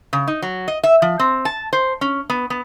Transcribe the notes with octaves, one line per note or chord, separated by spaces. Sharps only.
C#3
D#4
F#3
D#5
E5
F3
C4
A5
C5
C#4
B3
B3